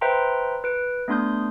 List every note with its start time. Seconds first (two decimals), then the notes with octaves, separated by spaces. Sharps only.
0.01 B4 C5 E5 G5 A#5 C6
0.64 B4 D7
1.08 A3 B3 D4 C6 D#6 G6